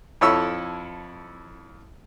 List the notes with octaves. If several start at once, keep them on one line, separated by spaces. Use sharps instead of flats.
F2 E4 A4 C#5 B5 E6